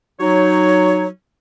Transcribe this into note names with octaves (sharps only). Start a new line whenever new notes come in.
F#3 D#4 C#5